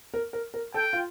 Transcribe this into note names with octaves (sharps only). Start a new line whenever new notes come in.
A#4
A#4
A#4
A4 G5
F4